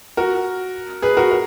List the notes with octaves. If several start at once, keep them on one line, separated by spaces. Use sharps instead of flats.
F#4 A#4
G#4 B4
F#4 A#4
A#4